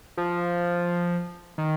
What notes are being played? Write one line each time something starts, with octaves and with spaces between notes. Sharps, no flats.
F3
D#3